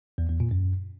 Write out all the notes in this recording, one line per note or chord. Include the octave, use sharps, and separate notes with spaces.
E2
E2
A#2
F#2